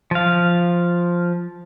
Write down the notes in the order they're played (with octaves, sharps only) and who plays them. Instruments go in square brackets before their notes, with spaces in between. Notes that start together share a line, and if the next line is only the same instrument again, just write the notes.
[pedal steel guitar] F3 F5